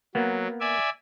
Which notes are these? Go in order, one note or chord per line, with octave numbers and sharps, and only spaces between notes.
F#3 A#3 B3
D5 E5 G#5